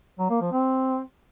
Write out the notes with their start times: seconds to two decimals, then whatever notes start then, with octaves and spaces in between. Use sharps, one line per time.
0.19 F#3
0.30 A#3
0.41 F3
0.52 C4